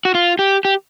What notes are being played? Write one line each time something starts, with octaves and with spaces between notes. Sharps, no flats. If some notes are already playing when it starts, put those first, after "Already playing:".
F#4
F4
G4
G4